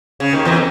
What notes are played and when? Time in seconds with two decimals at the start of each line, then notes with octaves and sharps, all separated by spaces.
0.20 C#3
0.33 D#2 D#3
0.45 E2 E3